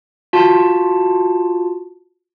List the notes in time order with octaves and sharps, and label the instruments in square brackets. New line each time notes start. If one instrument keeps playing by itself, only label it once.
[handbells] F4 F#4 A5